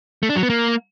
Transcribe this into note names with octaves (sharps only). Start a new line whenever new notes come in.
A3
D4
F#3
B3
A#3